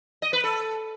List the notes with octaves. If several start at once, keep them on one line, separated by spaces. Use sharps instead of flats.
D#5
B4
A4